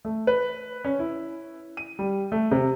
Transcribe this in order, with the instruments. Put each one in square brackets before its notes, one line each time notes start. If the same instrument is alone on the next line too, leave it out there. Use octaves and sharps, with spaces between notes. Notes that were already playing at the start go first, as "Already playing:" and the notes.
[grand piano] A3
B4
C#4
E4
D#7
G3
A3
C3